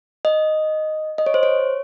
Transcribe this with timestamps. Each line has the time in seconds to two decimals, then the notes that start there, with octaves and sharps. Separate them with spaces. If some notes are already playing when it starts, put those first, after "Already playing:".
0.25 D#5
1.18 D#5
1.26 C#5
1.34 C5
1.43 C#5